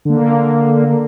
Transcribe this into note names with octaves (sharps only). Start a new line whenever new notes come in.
D3 A#3